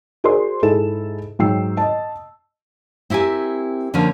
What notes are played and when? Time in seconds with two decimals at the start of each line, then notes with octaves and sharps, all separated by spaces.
0.24 F#4 G#4 A#4 C5 D5 C6
0.62 G#2 E4 G#4 A4 E7
1.39 G#2 F#3 G5 E6 C7
1.77 D#5 A5
3.10 C4 E4 G4 A#4 G#5
3.94 D3 F3 A#3 C#4 D4